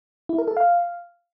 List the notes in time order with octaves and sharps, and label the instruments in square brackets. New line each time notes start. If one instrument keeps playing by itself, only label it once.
[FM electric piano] E4
A#4
A4
F5